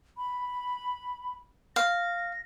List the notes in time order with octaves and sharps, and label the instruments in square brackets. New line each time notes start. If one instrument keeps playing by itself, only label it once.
[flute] B5
[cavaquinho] F5 [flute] A#6